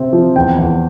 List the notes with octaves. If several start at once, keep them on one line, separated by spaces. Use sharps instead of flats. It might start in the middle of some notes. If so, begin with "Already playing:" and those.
Already playing: C3 C4
F3
E2 G5
E2